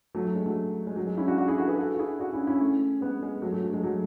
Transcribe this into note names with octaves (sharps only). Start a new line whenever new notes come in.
F#3 A3
F#3
G#3
F#3 A3
G#3
F#3
G#3
C#4 E4
D4 F#4
D4 F#4
E4 G#4
F#4 A4
G#4 B4
F#4 A4
F#4
E4 G#4
D4 F#4
C#4 E4
C#4 E4
A3 C#4
G#3 B3
G#3
F#3 A3
F#3 A3
F#3
G#3
F#3 A3